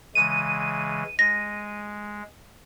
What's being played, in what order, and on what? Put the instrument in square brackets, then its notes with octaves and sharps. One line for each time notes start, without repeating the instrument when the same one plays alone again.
[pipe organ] C#3 E3 G#3 [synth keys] D#7
[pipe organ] G#3 [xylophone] A#6